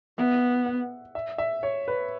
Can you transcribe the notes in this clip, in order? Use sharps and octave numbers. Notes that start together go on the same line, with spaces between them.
B3 E5
F#5
E5
E5
C#5
B4